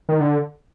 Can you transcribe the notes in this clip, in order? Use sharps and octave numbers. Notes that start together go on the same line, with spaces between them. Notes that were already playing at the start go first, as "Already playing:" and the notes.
D#3
D3